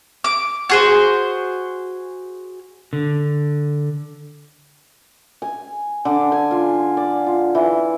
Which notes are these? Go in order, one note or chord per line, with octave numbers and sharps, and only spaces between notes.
D6
F#4 G#4 C5
D3
G#5
D3
G#5
F4
D5
F4
E3